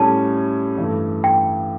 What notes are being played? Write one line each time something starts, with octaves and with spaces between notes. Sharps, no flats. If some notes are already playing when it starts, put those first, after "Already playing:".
Already playing: A2 G3 C#4 A5
G2 E3 A3
G5